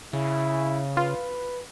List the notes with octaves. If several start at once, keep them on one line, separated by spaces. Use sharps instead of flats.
C#3 E4
F4 B4